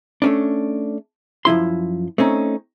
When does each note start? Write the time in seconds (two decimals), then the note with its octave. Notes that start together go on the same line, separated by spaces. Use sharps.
0.22 A3 C#4 D4
1.45 F#2 F3 E4 C6
2.18 A3 C4 C#4 D#4